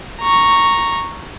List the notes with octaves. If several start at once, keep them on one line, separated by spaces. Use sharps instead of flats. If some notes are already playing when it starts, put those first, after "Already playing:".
A#5 C#6